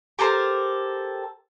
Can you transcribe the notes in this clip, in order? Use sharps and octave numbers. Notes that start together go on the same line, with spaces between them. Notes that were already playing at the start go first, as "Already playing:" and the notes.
G4 A4 A#4 C5